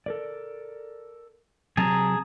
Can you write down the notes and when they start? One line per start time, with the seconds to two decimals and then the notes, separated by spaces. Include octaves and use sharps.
0.06 A4 A#4 D5
1.77 C3 F#3 C4 G#4 A5 A#5